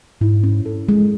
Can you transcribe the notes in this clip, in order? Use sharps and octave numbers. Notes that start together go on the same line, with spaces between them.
G#2 E4
C#4
A4
G#3